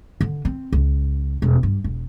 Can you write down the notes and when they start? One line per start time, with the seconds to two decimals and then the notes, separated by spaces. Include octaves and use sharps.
0.21 D3
0.45 C4
0.73 C#2
1.42 E1
1.63 G2
1.84 E1